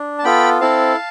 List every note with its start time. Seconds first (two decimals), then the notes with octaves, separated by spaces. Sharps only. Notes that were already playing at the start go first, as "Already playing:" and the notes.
Already playing: D4
0.18 A5
0.24 B3 F4 A4 G5 B5
0.60 C4 E4 A4 F5 A5